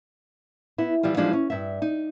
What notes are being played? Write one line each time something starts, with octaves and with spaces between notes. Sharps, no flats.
B3 E4
E3 F3 G3 F4
E3 F3 G3 G#3 D4 D#4
C#4
G2 E5
D#4